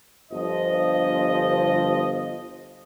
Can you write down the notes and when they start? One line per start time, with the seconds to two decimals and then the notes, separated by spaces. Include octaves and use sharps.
0.31 G1 F3 D#5